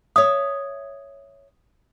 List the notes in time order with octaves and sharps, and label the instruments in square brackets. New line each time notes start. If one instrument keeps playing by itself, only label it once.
[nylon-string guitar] C#5 E5 [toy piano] D#6